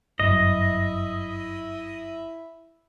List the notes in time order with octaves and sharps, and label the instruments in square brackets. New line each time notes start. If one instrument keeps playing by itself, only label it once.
[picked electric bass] G1 F#2 [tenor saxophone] E4 [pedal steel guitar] D#5